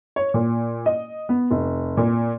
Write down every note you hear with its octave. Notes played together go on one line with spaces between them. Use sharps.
C#5
A#2
D#5
B3
F1
A#2